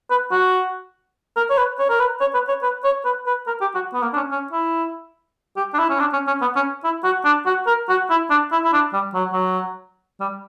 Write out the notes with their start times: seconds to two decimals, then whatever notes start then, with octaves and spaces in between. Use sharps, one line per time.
0.10 B4
0.32 F#4
1.37 A#4
1.50 C#5
1.58 B4
1.79 C#5
1.89 A#4
2.00 B4
2.21 C#5
2.34 B4
2.49 C#5
2.63 B4
2.84 C#5
3.05 B4
3.27 B4
3.47 A#4
3.61 G4
3.75 F#4
3.93 B3
4.02 A#3
4.13 D4
4.16 C#4
4.32 C#4
4.52 E4
5.57 G4
5.74 D4
5.79 E4
5.90 C#4
6.00 D4
6.13 C#4
6.27 C#4
6.41 B3
6.56 C#4
6.84 E4
7.04 F#4
7.25 D4
7.46 F#4
7.67 A#4
7.89 F#4
8.10 E4
8.30 D4
8.52 E4
8.64 E4
8.73 D4
8.93 G3
9.14 F#3
9.33 F#3
10.20 G3